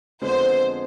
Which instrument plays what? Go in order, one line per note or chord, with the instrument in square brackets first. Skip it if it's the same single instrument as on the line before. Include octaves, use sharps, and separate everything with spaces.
[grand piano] F2 D3 F3 G#3 B3 [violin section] C5